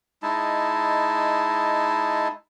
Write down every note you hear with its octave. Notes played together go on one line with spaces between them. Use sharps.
G#3 D#4 E4 A5